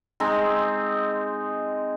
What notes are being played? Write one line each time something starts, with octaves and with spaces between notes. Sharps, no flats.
G#3 C4 D#4